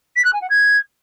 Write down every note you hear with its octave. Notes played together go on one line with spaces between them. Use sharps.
B6
F#6
G#5
F#5
G#6